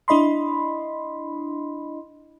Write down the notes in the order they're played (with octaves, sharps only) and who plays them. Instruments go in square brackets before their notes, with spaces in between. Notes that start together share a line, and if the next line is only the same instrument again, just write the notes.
[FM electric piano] D4 E4 D#5 B5 C6